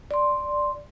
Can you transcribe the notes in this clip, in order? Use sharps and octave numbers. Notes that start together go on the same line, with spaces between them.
D5 C6